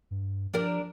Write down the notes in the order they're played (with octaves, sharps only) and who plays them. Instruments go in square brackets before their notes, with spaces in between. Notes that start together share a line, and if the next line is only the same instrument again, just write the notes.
[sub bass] G2
[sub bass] F3 [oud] D4 G4 A#4